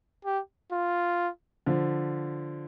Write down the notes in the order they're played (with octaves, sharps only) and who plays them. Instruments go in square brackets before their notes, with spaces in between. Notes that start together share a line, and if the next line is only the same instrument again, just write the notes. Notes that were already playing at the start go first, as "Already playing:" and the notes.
[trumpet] G4
F4
[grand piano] D3 F3